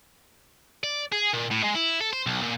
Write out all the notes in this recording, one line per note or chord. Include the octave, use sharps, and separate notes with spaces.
D5
G#4
A#2
A2
G#3
E4
A4
C5
B1
A#2